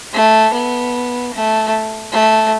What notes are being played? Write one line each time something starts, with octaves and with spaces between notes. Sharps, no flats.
A3
B3
A3
A3